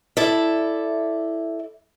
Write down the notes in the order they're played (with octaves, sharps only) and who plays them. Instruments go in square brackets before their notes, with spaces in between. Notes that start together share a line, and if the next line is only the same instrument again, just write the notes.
[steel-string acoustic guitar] E4 A4 D5 E5